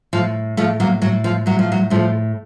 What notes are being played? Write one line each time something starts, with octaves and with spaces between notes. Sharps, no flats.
A2 F3
A2 F3 A3
F#3 A#3
A2 F#3
F3
A2 F#3
F3
F#3
A2 F3 A3